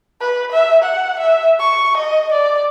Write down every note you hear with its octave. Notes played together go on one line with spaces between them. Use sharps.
B4
E5
F#5
E5
C#6
D#5
D5